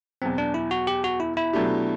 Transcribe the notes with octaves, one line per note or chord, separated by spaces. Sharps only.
E2 B2 F#3 C4
D4
E4
F#4
G4
F#4
E4
E4
B2 F#3 A3 D4 G4